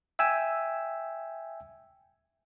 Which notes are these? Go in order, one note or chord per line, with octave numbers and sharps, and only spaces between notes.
E5 G5 G#5 E6